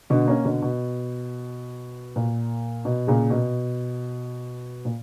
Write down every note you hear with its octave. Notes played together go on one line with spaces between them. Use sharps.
B2 D3
A#3 C#4
B2 D3
B2
A#2
B2
A#2 C#3
B2
A#2